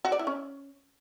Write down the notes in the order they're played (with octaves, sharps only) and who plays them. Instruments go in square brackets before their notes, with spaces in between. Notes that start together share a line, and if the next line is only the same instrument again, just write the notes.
[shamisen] F#4
D5
E4
C#4